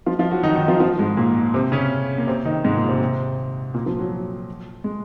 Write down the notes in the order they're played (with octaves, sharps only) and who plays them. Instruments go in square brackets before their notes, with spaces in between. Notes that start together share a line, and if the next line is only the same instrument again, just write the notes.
[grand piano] F3 F4
F3 F4
F#3 F#4
D#3 D#4
D#3 D#4
F3 F4
F3 F4
G#2 G#3
A#2 A#3
C3 C4
C#3 C#4
A#3
C3 C4
D#3 D#4
G#2 G#3
A#2 A#3
C3 C4
A#2 A#3
F3
F#3
G#3